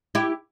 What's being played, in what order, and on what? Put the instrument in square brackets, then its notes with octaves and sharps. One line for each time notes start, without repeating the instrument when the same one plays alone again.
[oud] E4 G4